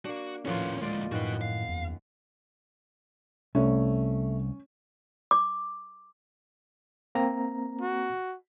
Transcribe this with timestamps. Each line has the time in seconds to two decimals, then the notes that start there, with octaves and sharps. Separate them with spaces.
0.05 A#3 D4 F#4
0.45 D#1 A2 F3 A#3 C#4 F4 B4
0.81 D2 G#3 F4 D5 D#5
1.12 F#2 A2 D#3 F#4 B4 F#6 C#7
1.41 F5
1.69 E2
3.55 C2 A3 C#4
5.31 D6
7.15 A#3 C4 A#5
7.81 F#4